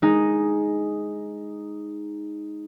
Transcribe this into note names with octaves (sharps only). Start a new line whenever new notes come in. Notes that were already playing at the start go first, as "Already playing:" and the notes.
G#3 D#4